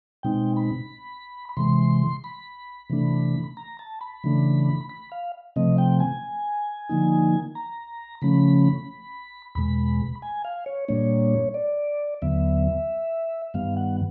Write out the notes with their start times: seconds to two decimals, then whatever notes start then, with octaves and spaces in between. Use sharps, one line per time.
0.23 B2 G#3 C4 D#4 G5
0.57 B5
1.49 B5
1.57 C3 E3 G#3 C6
2.24 B5
2.90 C3 E3 A3 D4
3.57 A#5
3.79 A5
4.01 B5
4.24 C#3 E3 A3 D4
4.89 B5
5.12 F5
5.56 C3 F3 A3 C4 D#5
5.78 G5
6.00 G#5
6.89 D3 F3 A#3 D#4
7.55 A#5
8.22 C#3 F3 A3 C#4 B5
9.55 E2 B2 G#3 B5
10.22 G#5
10.45 F5
10.66 C#5
10.88 A#2 G3 A#3 D4 C#5
11.54 D5
12.22 D#2 D3 F#3 B3 E5
13.54 G2 D#3 G3 B3 F5
13.77 F#5